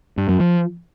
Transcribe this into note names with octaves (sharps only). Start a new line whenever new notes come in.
G2
F#2
F3